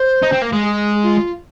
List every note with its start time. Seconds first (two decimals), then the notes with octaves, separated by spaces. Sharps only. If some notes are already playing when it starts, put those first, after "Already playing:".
Already playing: C5
0.23 D#4
0.33 C4
0.42 A#3
0.53 G#3
0.63 G#4
1.03 F4